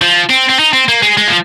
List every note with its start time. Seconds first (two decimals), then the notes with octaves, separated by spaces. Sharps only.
0.01 F3
0.30 C4
0.49 C4
0.59 D#4
0.73 C4
0.89 A#3
1.03 G#3
1.17 G#3
1.27 F3